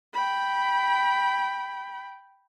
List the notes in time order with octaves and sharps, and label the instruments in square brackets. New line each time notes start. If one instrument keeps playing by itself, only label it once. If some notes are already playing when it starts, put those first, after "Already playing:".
[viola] G5 B5